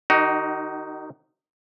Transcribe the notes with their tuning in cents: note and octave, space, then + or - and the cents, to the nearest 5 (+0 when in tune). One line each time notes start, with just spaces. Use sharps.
D#3 -40 D#4 +0 F#4 +40